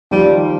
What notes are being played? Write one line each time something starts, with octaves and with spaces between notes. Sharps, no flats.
D#3 F3 G3